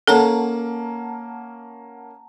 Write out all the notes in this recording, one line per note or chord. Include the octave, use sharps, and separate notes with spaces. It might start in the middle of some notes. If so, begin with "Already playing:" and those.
A#3 C#4 A4 F#5 A5 A#5